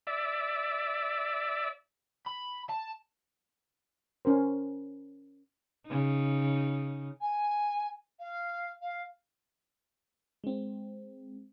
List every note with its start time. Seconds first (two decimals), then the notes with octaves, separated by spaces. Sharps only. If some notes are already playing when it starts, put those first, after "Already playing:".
0.07 D5 E5
2.27 B5
2.69 A5
4.25 C#4 A#4 C5
5.86 C#3 D#4
7.21 G#5
8.19 F5
8.81 F5
10.44 G#3 C4